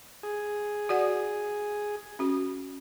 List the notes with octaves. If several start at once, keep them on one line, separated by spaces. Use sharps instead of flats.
G#4
F#4 D5 F#5
C#4 F#4